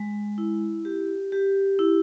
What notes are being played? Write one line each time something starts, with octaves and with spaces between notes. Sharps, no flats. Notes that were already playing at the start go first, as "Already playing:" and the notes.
Already playing: G#3
E4
G4
G4
E4